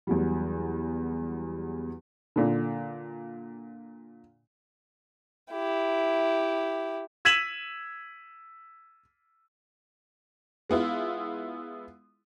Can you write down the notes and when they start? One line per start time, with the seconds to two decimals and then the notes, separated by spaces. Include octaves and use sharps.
0.07 E2 F#3 G3
2.36 A#2 D3
5.52 E4 G4
7.25 E6 G#6 B6 D#7 E7 F#7
10.69 G#3 B3 E4 F4